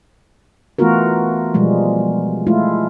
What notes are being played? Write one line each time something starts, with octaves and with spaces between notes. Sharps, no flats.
E3 A3 B3 F4 F#4 A#4
B2 F3 G3 G#3
G#3 A3 E4 F4